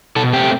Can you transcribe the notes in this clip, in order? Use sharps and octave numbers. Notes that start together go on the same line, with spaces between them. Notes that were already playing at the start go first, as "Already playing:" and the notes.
B2 A4
A3 C4 G4